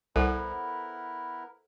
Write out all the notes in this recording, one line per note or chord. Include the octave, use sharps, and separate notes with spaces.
C2 B3 E4 A4 A#4 C5 F#5